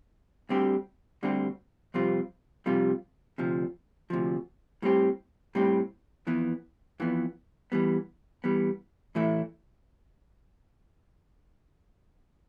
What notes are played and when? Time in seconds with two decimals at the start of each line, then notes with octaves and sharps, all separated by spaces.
0.49 D2 D3 G3 C4 G4
1.23 D2 D3 G3 C4 G4
1.94 F2 C3 G3 C4 F4
2.66 F2 C3 G3 C4 F4
3.38 D2 C3 F3
4.10 D2 C3 F3
4.82 A2 G3 C4 G4
5.55 A2 G3 C4 G4
6.27 F2 E3 B3
7.00 F2 E3 B3
7.72 E3 G3 B3
8.44 E3 G3 B3
9.15 A2 E3 A3 E4